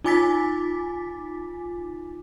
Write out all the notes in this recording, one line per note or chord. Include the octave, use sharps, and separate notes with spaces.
D#4 F4 G#5 D6 A6 B6